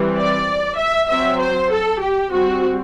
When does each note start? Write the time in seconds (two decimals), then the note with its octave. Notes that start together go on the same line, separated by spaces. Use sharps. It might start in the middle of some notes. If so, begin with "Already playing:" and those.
Already playing: E3 G3 C4
0.16 D5
0.78 E5
1.09 F#3 C4 E5
1.40 C5
1.71 A4
2.01 G4
2.33 G3 C4 F#4